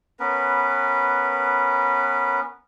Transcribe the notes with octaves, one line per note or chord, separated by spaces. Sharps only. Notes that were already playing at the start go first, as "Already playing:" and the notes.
B3 C#4 A#4 B4